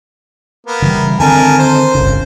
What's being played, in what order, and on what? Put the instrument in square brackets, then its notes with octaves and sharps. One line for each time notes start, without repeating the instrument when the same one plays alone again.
[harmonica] A#3 B3
[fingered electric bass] C#3 E3 G3
[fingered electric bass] D3 D#3 C4 [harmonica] A#4 G#5 A5
[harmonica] C5
[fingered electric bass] G1 C2 C#3